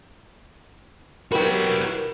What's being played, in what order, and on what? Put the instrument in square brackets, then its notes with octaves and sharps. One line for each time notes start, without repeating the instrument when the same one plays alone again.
[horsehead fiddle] F#3 G4 [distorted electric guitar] E4 F#4 [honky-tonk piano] A#4 [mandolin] B4 G5